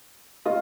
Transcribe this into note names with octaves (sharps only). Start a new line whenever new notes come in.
F4 D#5